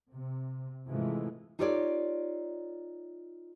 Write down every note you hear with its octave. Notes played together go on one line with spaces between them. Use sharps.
C3
G#2 C3 E3 F3 G#3 A3
D#4 F4 G4 A4 C#5 D5